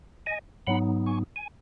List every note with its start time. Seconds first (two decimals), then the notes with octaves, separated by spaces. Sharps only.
0.26 D#5 G#5
0.67 G#2 F#3 B3 D#4 F#5 B5
1.06 G#5 C#6
1.36 G#5